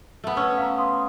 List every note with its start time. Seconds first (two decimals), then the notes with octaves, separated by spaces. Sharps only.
0.24 A3 B3
0.37 C#4 B4 C#6 E6
0.58 F5 A#5
0.78 F5 C6 D#6